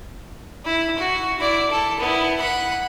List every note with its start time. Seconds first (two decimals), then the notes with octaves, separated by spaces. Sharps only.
0.65 E4
0.99 F#4
1.39 E4 D5
1.71 A4
2.00 B3 E4
2.40 F#5 B5